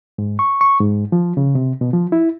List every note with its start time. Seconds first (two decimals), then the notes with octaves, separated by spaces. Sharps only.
0.18 G#2
0.39 C#6
0.61 C#6
0.80 G#2
1.12 F3
1.37 C#3
1.55 C3
1.81 B2
1.93 F3
2.12 E4